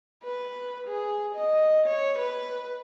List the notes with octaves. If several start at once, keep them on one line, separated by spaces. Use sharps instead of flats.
B4
G#4
D#5
C#5
B4